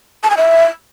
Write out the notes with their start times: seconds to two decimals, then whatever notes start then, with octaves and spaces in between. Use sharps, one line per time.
0.24 A5
0.30 G#5
0.37 E5